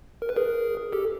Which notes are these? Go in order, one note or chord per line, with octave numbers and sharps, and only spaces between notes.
A#4
B4
G#4 A#4
G4 A4